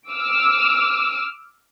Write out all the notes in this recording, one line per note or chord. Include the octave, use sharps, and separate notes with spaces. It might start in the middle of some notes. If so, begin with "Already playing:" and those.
D6 E6 F6